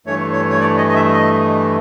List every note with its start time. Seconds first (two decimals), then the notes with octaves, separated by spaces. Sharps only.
0.06 G2 E3 A3 C#5
0.33 C#5
0.50 C#5
0.60 D5
0.77 D#5
0.89 D#5
0.95 E5
1.13 D#5